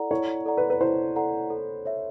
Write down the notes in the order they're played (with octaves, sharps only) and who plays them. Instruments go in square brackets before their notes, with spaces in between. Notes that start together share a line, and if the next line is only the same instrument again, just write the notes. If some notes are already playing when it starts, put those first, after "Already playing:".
Already playing: [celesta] E4 A4 D5 F#5 A#5
[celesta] E4 [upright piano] C#5
[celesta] A4 D5 F#5 A#5
[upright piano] B4
B4
[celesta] E4 [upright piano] C5
[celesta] A4 D5 F#5 A#5
A4
C#5 E5